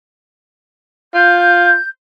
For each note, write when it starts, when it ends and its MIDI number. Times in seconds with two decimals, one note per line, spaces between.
1.14 1.75 65
1.14 1.88 91